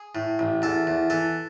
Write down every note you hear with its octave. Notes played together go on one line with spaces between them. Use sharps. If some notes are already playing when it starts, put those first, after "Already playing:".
Already playing: G#4
A2
A1
E2 A4
E2
E3 A4